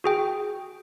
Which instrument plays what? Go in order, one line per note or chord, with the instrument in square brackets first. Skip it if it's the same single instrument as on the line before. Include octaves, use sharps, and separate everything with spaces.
[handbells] F#4 G#4 G5